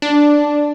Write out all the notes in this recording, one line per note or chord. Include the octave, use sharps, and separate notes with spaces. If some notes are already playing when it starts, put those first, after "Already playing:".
D4